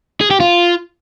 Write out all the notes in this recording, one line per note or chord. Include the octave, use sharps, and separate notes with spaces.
G#4
G4
F4